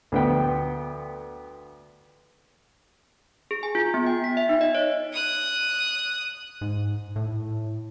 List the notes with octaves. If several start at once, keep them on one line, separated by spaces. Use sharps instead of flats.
D2 B3 G5
G#4
G#5
F4
B3
G5
B6
E5
D#4
D#5
C#5
D#6 F#6
G#2
A2